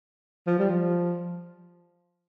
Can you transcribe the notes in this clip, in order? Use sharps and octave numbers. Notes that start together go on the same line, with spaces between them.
F3
G3
F3